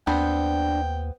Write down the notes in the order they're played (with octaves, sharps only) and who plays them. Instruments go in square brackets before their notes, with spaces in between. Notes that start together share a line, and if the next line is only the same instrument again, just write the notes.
[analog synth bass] D#2 [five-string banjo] B3 C4 [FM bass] D4 [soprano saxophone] G5